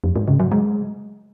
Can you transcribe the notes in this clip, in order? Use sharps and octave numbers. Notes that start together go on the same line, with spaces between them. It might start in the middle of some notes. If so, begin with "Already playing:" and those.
F2
G#2
C#3
F#3
G#3